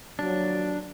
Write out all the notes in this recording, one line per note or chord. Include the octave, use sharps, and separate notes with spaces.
D#2 F3 F#3 D4